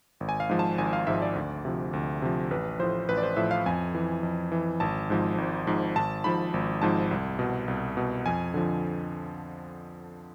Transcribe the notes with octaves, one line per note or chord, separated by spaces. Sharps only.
G#1
G#5
F5
G#2 F3
A5
G#1 G#5
F5
G#2 F3 E5
D5
D2
C3 F3
D2
C3 F3
A1 B4
A2 F3 C5
A1 B4
D5
C5
A2 F3 E5
F5
F2 G#5
E3
F2
E3
G#1 A5
G#2 F3
G#1
G#2 F3
G#1 A5
G#2 F3 B5
G#1
G#2 F3 A5
C2
B2
C2
B2
F2 G#5
D3 F3